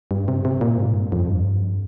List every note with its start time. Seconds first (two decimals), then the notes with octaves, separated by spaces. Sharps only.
0.11 G2
0.28 C3
0.45 C3
0.61 A#2
0.78 G#2
0.95 G2
1.12 F2
1.29 G2